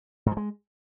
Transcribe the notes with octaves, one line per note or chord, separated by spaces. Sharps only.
G#2
F3
G#3